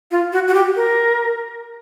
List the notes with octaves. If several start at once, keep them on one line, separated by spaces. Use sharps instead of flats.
F4
F#4
F#4
G4
A#4